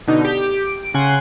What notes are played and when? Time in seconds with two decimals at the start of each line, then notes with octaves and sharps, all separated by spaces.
0.08 B2 D3 D#4
0.24 G4
0.63 D7
0.94 C#3 F#5 G#5 C6 F#6